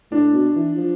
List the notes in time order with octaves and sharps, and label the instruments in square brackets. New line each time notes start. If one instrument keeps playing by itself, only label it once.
[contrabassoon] A2 [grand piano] D4
[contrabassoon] B2
E3
F3